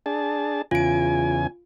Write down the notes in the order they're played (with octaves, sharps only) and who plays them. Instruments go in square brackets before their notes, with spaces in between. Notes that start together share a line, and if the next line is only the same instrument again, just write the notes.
[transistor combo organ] D4 G#4 A5
[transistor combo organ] E2 C#3 G#5 [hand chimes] F4 D7